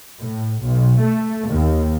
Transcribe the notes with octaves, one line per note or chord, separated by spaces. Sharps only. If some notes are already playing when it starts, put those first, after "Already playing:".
A2
B1
A3
D#2